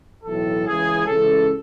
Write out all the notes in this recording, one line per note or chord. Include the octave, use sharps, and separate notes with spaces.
B1 A2 E3 A4
C#2 C#3 E3 G#4
C#2 C#3 E3 A4